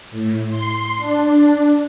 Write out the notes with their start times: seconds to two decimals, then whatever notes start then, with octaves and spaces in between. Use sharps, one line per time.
0.11 A2
0.50 C6
0.98 D4